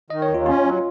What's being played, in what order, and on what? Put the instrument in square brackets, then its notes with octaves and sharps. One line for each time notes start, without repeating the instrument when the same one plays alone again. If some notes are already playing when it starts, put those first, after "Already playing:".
[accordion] D#3 [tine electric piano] D#5
[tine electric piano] C#5
[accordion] D#2
[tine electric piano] F4
[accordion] C#4 [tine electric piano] F4
[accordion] F#3